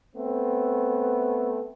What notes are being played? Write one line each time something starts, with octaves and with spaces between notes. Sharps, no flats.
A3 B3 C4